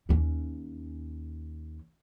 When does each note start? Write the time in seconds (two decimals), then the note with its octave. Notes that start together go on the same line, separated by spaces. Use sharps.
0.09 D#2 C#4